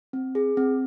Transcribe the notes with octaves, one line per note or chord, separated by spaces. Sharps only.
C4
G#4
C4